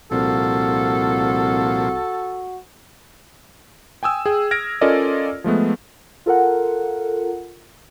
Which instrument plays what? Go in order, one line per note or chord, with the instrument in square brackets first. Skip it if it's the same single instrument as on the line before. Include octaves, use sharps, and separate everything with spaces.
[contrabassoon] C2 [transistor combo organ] A#2 F3 [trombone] F#4 [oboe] A4
[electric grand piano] G5 G#5 D#6 E6
G#4 G5
F6 G#6 A#6 D7
C#4 F4 A4 A#4 D5 D#5
F3 G#3 A3 B3
[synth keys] F4 A4 A#4 F#5